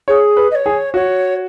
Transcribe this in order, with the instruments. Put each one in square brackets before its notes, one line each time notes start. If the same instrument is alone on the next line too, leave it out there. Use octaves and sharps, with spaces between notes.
[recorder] G#4 [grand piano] C#5
[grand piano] B4
[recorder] D#5
C#5
[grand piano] G#4
[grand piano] F#4 [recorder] C#5